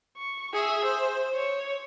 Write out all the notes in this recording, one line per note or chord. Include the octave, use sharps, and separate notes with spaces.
C#6
G#4 E5
C5
C#5